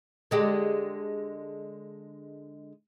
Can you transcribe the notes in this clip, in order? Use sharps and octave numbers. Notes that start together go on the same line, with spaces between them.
D3 G#3 G4